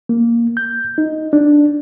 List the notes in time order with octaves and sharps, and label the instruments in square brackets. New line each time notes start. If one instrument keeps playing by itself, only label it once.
[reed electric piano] A#3
G6
D#4
D4